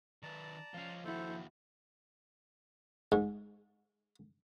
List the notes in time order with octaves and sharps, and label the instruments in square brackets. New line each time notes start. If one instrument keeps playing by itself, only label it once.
[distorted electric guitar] D#3 B4 [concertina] D5 A5 A#5
[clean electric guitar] F3 F5 [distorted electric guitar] C#4 F4
[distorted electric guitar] D#2 F#4 [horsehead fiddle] E4 [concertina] A4 C5
[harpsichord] G#2